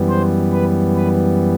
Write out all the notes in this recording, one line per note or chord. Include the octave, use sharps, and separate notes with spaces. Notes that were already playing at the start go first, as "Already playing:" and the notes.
Already playing: F#2 E3 G3 B3
C5
B4
B4